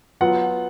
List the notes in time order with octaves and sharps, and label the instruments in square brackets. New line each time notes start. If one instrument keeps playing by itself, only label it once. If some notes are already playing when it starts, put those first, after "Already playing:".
[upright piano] F#3 B3 F4 F#5